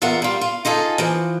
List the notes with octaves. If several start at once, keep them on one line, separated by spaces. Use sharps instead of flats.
E2 F4 A#4 E5 F#5
G3 F4
F4
D#4 F4 G#4 A4
E3 F3